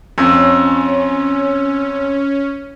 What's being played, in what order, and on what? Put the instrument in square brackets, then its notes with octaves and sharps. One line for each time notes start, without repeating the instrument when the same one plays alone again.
[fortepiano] F2 [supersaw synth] C#4